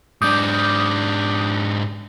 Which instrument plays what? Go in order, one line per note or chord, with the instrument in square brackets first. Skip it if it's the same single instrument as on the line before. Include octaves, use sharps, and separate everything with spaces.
[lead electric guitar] G#2 D4 [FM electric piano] D6 D#6 G6